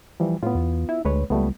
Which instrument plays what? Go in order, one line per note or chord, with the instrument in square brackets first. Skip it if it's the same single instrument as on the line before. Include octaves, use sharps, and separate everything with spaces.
[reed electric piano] E3 F3 G3
[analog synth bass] A2 [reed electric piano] B3 F4
[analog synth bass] E2
E4
[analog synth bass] D2 [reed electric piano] G#3 B4 C#5
[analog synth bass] C#2 [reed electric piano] G3 A3 B3